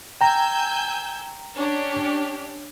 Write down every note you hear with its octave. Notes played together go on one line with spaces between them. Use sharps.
G5 G#5 A#5 E6 G6
C#4 D4 G4